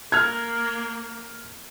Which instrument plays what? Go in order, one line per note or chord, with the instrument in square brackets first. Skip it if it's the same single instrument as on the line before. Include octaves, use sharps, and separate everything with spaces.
[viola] A#3 [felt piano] F6 G#6